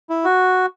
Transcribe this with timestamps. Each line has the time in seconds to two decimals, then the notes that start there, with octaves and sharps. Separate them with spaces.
0.10 E4
0.25 F#4